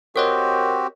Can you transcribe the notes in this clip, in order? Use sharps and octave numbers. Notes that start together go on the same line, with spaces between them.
C4 F#4 G4 A#4 C#5 D#5